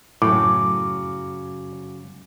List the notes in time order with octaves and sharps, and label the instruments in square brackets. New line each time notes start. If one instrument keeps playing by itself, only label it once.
[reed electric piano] F#2 D6 [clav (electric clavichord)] A2 [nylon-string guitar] C#3 F#3